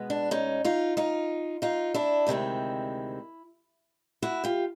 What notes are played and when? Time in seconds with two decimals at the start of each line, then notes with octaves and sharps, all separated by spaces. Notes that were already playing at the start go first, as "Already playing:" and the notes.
Already playing: B2 G#3 B3
0.10 D4
0.31 C#4 D#4
0.65 D#4 F4
0.97 D#4 F4
1.62 D#4 F4
1.94 D4 E4
2.27 D2 C3 D#3 G#3 C4
4.22 E4 F#4
4.44 F4 G4